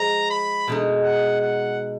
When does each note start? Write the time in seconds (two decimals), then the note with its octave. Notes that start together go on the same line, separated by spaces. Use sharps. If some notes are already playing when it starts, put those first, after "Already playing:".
Already playing: F3 G#3 A#5
0.30 B5
0.68 B2 G#3 D#4
1.03 F#5
1.41 F#5